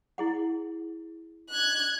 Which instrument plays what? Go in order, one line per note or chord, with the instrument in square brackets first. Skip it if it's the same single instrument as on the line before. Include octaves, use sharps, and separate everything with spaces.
[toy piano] E4 G#4 F#5
[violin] F#6 G#6